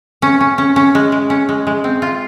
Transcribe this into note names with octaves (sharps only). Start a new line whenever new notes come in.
C#4
C#4
C#4
C#4
G#3
G#3
C#4
G#3
G#3
C4
F4